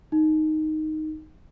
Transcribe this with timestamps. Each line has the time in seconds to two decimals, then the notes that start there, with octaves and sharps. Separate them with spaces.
0.12 D#4